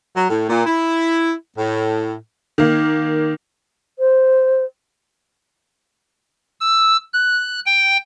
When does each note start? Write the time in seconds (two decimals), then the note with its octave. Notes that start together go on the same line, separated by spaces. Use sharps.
0.15 F#3
0.29 A2
0.49 A#2
0.66 E4
1.57 A2
2.58 D#3 A#3
3.99 C5
6.60 E6
7.13 F#6
7.66 G5